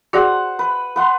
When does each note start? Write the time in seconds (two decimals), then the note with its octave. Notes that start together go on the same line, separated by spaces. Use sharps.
0.13 F#4 G#4 C5 D5 F#5
0.59 B4
0.96 B4 F#5 C6